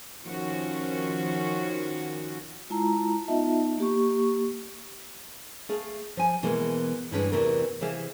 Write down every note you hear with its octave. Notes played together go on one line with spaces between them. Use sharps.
D#3 F3 C#4 F#4
G#3 E4 F4 A5 A#5
B3 D#4 F4 D#5 E5 A5
A#3 G4 C#6
A3 G#4 F5
F3 G#5
B2 E3 G#3 A#3
G2 D3 E3 G#3 C4 C#4
E2 C3 E3 A3 A#4
C3 E3 G#4 E5 F5